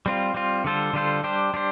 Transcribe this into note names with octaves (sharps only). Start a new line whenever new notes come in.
G3 C4 F4
G3 C4 F4
D3 G3 F4 A4 C5
D3 G3 F4 A4 C5
G3 D4 G4 C5
G3 D4 G4 C5